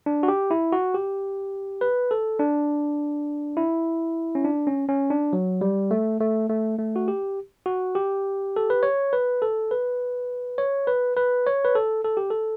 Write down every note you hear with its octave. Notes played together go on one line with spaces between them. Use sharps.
D4
F#4
G4
E4
F#4
G4
B4
A4
D4
E4
C#4
D4
C#4
C#4
D4
F#3
G3
A3
A3
A3
A3
F#4
G4
F#4
G4
A4
B4
C#5
B4
A4
B4
C#5
B4
B4
C#5
B4
A4
A4
G4
A4